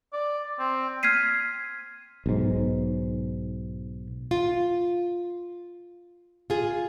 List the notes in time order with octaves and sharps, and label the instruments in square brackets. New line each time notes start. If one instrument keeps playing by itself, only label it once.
[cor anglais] D5
C4
[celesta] F6 G#6 B6 C7 D#7
[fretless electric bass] B1 G#2
[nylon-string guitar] F4
F4 G#4